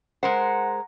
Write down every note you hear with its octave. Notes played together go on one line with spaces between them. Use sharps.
G#3 A#4 C5 F#5